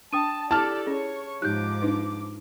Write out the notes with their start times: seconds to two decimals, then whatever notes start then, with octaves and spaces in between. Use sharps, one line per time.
0.13 D4 G5 A5 D#6 D#7
0.51 E4 G4 A4 D5 A5 F6
0.86 C#4 G#4 C#5 C#6
1.42 G#2 F3 D#4 G4 D6 F#6 G6
1.82 D4 D#4 B4